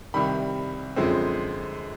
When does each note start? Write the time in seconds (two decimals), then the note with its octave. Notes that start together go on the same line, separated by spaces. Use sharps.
0.14 C2 C3 D#3 G3 B5
0.96 F#2 D3 F3 G#3 C4